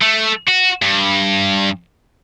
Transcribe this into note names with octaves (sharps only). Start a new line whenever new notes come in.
A3
F#4
G2